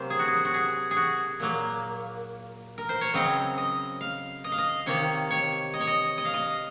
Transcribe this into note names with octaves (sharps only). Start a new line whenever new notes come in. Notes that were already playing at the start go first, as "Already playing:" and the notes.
Already playing: C3 F#3 A#3 C5
G#4
F#4
G#4
F#4
G#4
G#4
F#4
A#2 F#3 A#3
A#4
C5
C#5
C#3 F#3 C4 D#5
D#5
F5
D#5
F5
D#5
C3 D#3 A#3 C#5
C#5
D#5
C#5
D#5
D#5
F5
D#5